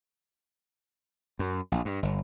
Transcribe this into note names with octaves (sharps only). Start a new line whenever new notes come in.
F#2
A#1
G2
G1